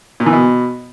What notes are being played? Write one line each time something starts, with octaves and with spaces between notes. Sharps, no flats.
A#2
E3
B2